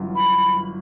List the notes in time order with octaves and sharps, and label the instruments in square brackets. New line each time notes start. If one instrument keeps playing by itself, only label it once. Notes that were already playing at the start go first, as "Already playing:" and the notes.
Already playing: [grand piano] G1 F#2 E3
[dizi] B5